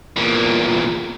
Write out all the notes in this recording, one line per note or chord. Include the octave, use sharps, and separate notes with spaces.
E2 A#2